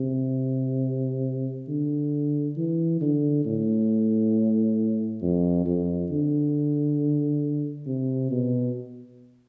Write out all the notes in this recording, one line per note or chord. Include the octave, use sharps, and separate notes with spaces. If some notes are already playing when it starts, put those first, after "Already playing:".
Already playing: C3
D3
E3
D3
A2
F2
F2
D3
C3
B2